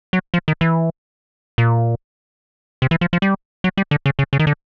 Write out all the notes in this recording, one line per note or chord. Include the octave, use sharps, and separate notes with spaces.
F#3
F3
D#3
E3
A#2
C3
E3
F3
F3
G3
F#3
G3
D3
C#3
C#3
C#3
D#3
D3